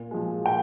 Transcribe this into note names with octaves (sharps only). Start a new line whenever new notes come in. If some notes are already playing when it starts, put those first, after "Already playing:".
Already playing: A#2
F3 G#3
A#2 G5